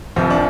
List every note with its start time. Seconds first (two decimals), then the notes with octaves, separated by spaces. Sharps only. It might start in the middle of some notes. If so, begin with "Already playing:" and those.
0.16 F1 F2 C3 F3 C4
0.30 D4